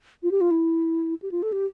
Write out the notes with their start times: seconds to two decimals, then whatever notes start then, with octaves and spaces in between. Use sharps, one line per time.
0.23 F4
0.31 G4
0.41 F4
0.51 E4
1.22 G4
1.32 F4
1.43 A4
1.52 G4